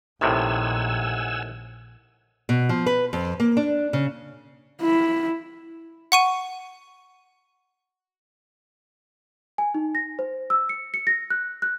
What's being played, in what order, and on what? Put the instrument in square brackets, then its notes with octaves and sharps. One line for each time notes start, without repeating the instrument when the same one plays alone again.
[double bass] A#1 [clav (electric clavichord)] A2 C3 D#3 [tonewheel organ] F#5 G#5 E6
[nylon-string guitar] B2
F3
B4
F2
A#3
D4
C#3
[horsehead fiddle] E4
[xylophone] F#5 C#6 D#7
[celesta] G#5
D#4
A#6
C5
E6
C#7
C#7
A#6
F#6
F#6